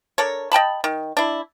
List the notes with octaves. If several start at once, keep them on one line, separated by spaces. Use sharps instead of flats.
D4 A4 A#4 C#5
D#5 G5 A5 B5
D#3
D4 E4